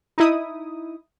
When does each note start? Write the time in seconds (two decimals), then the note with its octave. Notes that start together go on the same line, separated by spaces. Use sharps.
0.18 D#4 E4 D#6